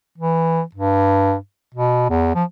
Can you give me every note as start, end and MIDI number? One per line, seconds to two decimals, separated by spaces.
0.18 0.61 52
0.74 1.36 43
1.74 2.06 47
2.09 2.30 40
2.35 2.44 53